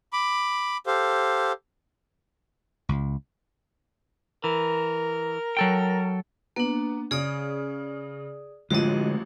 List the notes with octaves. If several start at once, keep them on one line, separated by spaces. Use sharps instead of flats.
B5 D6
G4 A4 C5 F5
C#2
E3 A#4
F#3 A4 G5
A#3 B3 D4
C#3 G#4 D5 D#6
A1 D3 F3 G#3 F#4 D#5